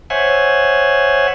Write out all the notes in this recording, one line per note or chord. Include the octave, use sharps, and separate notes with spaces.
C5 C#5 E5 F#5 G#5